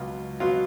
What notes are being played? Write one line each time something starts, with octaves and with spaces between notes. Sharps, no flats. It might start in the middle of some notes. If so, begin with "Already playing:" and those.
Already playing: C#2 B2 F#3 F4
B2 F#3 F4